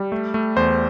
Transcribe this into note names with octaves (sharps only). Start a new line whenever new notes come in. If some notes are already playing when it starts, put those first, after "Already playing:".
Already playing: G3
A3
A3
E2 C5